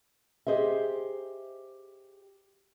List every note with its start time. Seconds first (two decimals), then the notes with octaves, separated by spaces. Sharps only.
0.47 G4 G#4 C5 D#5 E5